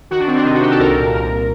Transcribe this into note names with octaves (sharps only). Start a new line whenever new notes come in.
D#3 F#4
D4
D#3 C4
D4
C3 D#4
F#4
D#3 G4
A4
C2 A#4
A#2
C2 A#4